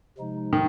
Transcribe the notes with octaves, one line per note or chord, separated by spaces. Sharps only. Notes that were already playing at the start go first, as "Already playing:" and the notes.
C3 F3 G#3 D#4
D#3